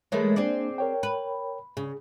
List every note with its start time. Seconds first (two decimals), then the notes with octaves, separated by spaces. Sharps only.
0.12 E3 G#3 A3 A#4 C#5
0.36 A#3 C4 D4 G#4 D5
0.78 A#4 C#5 G5
1.03 B4
1.77 C#3 G#4